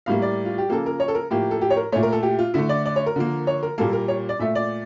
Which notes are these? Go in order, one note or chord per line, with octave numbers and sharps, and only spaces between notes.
A2 G3 A#3 F5
D5
F4
G4
C#3 F3 A#3 A4
A#4
C#5
A4
A#4
A2 F3 A#3 G4
A4
G4
C#5
A#4
A#2 A3 C#5
A#4
A4
G4
F4
D3 A3 E4
D5
D5
C#5
A#4
D3 F3 A#3
C#5
A#4
A#2 G3 A#3 A4
A#4
C#5
D5
A#2 A3 E5
D5